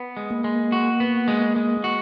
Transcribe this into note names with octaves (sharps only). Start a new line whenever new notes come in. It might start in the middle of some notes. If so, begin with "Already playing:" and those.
Already playing: B3
G#3
A#3
G#3
F#4
B3
G#3
G#3
F#4